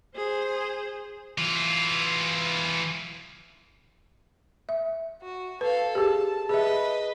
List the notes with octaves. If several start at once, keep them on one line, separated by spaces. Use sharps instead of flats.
G#4 C5
E3 F4
E5
F#4
A4 B4 F5
G4 G#4 A5
G#4 B4 D#5 E5